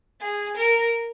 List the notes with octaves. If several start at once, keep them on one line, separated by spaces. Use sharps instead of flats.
G#4
A#4